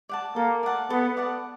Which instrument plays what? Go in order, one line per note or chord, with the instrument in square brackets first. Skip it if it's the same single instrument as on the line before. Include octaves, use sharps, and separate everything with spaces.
[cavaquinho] D5 F#5 A5
[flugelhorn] A#3 [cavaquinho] A4
[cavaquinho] D5 F#5 A5
[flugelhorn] B3 [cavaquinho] A4
[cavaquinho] D5 F#5 A5